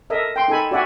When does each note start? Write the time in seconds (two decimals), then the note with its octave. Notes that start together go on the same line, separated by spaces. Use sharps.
0.10 A4 A#4 D#5 E5
0.36 G5 C6
0.48 D#4 A4 G#5 B5
0.71 F#4 D5 E5 F#5 G#5